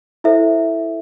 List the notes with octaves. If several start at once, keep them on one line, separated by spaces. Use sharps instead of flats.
E4 A4 C5 E5